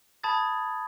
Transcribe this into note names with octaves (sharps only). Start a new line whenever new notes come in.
A5 B5 D#6 G#6 A6